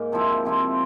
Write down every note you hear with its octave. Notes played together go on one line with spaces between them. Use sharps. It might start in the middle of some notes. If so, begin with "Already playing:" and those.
Already playing: G#2 A#3
C3 F3 C4 E4
C3 F3 C4 E4